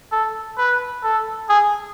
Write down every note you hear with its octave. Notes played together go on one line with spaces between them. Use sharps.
A4
B4
A4
G#4